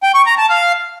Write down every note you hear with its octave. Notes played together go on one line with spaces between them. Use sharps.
G5
C#6
A#5
A5
F5